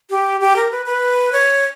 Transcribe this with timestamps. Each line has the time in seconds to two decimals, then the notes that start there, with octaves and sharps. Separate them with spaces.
0.10 G4
0.41 G4
0.56 A#4
0.71 B4
0.86 B4
1.32 C#5